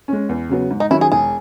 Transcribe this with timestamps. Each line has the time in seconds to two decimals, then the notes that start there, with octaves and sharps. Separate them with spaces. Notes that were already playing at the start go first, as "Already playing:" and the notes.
0.08 G#3 C#4
0.29 E2
0.49 C#3 F#3 B3
0.71 G#2
0.80 D#4
0.91 D#3 F#3 C#4 E4
1.01 G#4
1.12 E1 G#4